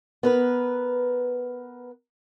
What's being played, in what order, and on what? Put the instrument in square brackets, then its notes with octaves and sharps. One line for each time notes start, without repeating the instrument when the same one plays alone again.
[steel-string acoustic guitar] B3 A#4 B4